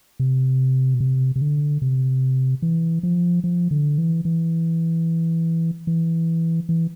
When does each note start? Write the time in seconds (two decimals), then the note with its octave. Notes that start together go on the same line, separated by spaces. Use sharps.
0.20 C3
0.94 B2
1.00 C3
1.36 C3
1.41 D3
1.82 C3
2.62 E3
3.03 F3
3.44 F3
3.71 D3
3.98 E3
4.25 E3
5.87 E3
6.69 E3